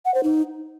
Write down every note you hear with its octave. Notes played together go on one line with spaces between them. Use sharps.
F#5
C5
D#4